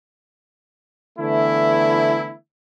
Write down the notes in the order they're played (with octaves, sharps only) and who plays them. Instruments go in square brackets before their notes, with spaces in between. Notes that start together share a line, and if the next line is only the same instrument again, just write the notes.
[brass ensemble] D3 E3 A3 B3 E4